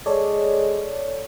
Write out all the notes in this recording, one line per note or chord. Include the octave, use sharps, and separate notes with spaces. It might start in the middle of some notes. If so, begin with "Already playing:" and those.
G#3 A4 C#5 D5